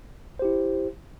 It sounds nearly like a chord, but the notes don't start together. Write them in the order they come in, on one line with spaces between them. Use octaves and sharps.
C5 G4 E4